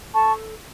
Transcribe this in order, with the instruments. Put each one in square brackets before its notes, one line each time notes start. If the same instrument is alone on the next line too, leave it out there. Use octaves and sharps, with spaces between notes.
[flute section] A4 A5 C#6